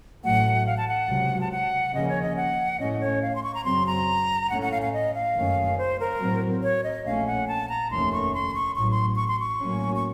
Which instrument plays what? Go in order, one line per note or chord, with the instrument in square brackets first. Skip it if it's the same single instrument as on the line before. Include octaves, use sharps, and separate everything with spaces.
[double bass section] A1 A2 F#3 A3 [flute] F#5
[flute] F5
A5
F#5
[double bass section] C#2 C3 F#3
[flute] A5
F#5
[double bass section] D#2 C#3 F3 A#3 C#4 [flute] D#5
[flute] C#5
D#5
F#5
[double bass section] A2 A3 C#4 [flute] D#5
[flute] C#5
F5
C6
C#6
A#5
[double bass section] F#2 C#3 F#3 C4 [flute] C6
[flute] A#5
[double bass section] A2 A3 C#4 [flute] F#5
[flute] F#5
F5
F5
D#5
F5
[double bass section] F#1 F#2 D#3 A3 C#4
[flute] C5
A#4
[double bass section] A2 F#3 C4
[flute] C#5
D#5
[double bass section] A#1 A#2 A3 C#4 [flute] F5
[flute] F#5
A5
A#5
[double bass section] F1 D#2 D#3 A3 C#4 [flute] C6
[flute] C#6
C6
C#6
[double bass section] A1 A2 F#3 [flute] C#6
[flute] C6
C#6
C6
C#6
[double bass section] A2 F#3 A#3 C#4
[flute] C#6